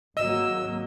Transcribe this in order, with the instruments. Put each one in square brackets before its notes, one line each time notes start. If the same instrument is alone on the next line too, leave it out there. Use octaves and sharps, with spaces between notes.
[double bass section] G#1 F#3 A#3 [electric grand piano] D#5 [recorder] E6